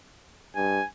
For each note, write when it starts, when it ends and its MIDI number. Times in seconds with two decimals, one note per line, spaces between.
0.56 0.80 43
0.56 0.88 80